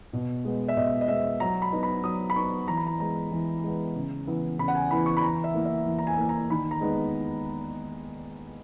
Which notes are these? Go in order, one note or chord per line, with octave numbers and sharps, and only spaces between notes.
B2
G#3 B3
E5
B2 D#5
D#5
G#3 B3 E5
F#3 A#5
B5
B3 D#4
B5
F#3 D#6
B5
B3 D#4 C#6
E3 A#5
B5
A#5
G#3 B3 A#5
E3
G#3 B3
C#3
E3 B3 E4
C#3 B5
F#5
G#5
E3 B3 E4 B5
C#6
B5
E3 A#5
E5
A#3 E4
E5
E3
A#5
G#5
A#3 E4
A#5
D#3 B5
A#5
G#3 B3 D#4